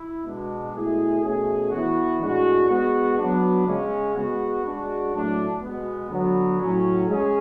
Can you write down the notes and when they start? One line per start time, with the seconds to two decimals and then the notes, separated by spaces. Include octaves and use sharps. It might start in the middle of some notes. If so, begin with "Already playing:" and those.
Already playing: E4
0.24 B2 G#3 D4
0.74 B2 A3 E4 G#4
1.22 B2 A3 C#4 G#4
1.70 E3 B3 F#4
2.20 A2 G#3 D4 F#4
2.69 G#3 B3 F#4
3.18 F#3 B3 D4
3.66 C#3 G#3 C#4
4.15 G#3 B3 F#4
4.64 G#3 D4 F#4
5.13 A2 F#3 A3 D4
5.60 B2 G#3 B3
6.10 D3 F#3 B3
6.59 A2 F#3 C#4
7.08 G#3 C#4 G#4